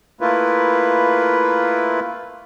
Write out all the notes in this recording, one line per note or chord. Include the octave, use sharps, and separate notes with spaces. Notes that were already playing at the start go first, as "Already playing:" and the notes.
A3 A#3 E4 F4 B4